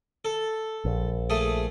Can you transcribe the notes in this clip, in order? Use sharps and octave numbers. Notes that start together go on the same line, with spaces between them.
A4
A#1
A3 G#4